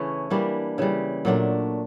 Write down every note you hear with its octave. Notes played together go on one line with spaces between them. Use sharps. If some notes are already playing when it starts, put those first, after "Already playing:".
Already playing: C#3 E3 A3 C#4
E3 G3 A#3 D4
C#3 E3 G3
A#2 F#3 A3 D4